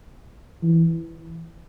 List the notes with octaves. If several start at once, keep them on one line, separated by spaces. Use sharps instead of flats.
E3